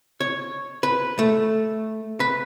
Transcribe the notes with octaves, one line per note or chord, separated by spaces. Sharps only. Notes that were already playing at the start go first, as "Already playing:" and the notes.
C#5
B4
A3
B4